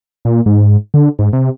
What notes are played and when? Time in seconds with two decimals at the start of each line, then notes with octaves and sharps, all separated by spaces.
0.25 A#2
0.46 G#2
0.94 D3
1.19 G#2
1.33 C3